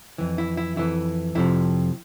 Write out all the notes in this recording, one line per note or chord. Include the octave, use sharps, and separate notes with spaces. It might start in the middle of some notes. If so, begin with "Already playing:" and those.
F2 E3
E4
E4
F2 E3 E4
F2 C3 F3 E4